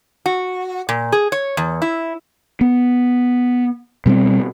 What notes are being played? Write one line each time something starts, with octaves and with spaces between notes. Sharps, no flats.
F#4
A#2
G#4
C#5
E2
E4
B3
B2 G3 A3 C4